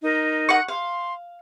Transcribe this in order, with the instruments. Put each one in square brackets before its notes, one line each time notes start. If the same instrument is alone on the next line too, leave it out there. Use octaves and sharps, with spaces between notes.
[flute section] D#4 A#4
[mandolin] F#5 C#6
[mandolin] F5 [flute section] C6